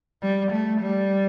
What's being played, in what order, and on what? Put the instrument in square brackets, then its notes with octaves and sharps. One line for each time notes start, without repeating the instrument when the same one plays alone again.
[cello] G3
A3
G3